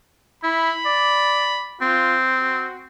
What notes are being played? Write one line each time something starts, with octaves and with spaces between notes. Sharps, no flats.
E4 B5
D5
C4 F4
F#4